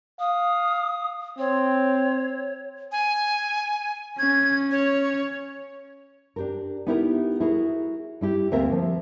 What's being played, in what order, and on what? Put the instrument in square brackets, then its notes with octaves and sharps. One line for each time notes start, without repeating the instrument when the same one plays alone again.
[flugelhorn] F5 [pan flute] D#6
[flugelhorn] C4 [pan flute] C#5
[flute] G#5
[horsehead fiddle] C#4 [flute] G#6
[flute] C#5
[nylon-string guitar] D4 G4 A#4
B3 D#4 E4 G4 A4 A#4
E4 F#4 G#4 A#4
G3 E4 G4
D2 A#3 C4 A#4 E5 F5
F3